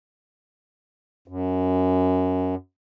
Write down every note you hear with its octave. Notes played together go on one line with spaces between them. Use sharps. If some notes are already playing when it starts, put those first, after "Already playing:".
F#2